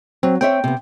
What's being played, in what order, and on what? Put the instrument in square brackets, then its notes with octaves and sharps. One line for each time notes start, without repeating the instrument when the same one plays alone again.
[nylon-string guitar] F#3 [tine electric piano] C4
[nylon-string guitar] C4 C#5 E5 [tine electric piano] G5
[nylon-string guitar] C3 B3